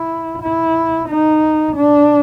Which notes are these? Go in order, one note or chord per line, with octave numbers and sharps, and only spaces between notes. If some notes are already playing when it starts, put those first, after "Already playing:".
Already playing: E4
E4
D#4
D4